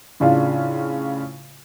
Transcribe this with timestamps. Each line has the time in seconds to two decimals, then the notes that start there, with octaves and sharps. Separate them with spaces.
0.20 A2 C#3 D4 F4